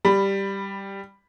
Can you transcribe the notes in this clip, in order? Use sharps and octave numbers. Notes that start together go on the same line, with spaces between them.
G3 B5